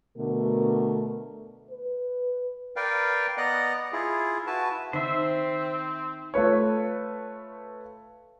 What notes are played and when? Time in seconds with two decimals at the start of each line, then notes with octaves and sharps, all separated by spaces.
0.18 B2 D3 A3 A#4
1.71 B4
2.76 A#4 B4 D5 F5 G5
3.37 B3 D5 D#5 F#5 A#5 F#6
3.92 E4 F4 G#4
4.47 E4 F#4 B4 A5
4.93 D#3 C4 C5 E5
6.34 A3 F4 B4 C#5